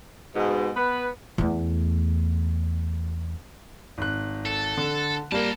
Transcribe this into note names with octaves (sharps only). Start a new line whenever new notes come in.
G#2 B2
B3 B4
E2 A3
G#1 F#6
A4
D3
G3 A#3 A#4 A5